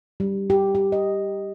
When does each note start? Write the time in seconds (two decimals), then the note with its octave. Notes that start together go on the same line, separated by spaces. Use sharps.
0.20 G3
0.50 G4
0.75 G4
0.92 D#5